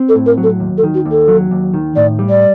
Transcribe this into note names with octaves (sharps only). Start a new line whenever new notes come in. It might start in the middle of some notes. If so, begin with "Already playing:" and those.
Already playing: C4
A4
A2
A#4
F#3
A4
D#2
A4
D#3
F#4
D#2
A4
F#3
D#2
D#3
A2 D5
G3
D5